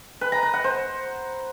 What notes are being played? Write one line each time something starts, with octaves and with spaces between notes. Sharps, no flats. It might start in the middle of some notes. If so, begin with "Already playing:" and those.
B4
A#5
B4
F#5
C5